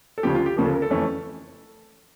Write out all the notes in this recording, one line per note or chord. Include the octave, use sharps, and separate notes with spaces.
A4
D2 C#3 F3 G4
F4
G4
D2 C#3 F3 A#3 G4
A4
A#4
A4
F2 E3 A3 C#4